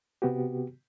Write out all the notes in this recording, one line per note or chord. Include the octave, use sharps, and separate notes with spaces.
C3 B3 F#4 G4